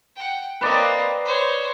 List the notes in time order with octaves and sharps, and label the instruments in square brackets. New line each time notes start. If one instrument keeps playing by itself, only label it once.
[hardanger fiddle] F#5 G5
[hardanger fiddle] A#3 C4 [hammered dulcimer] B4 D5 D#5
[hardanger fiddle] C5 C#5